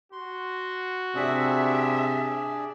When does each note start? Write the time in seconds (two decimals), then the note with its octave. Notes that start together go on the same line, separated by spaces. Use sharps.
0.12 F#4 C6
1.15 C3 D4 G#4 D5 E5